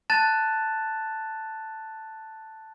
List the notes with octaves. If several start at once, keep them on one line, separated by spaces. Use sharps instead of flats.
A5 F#6 A6 E7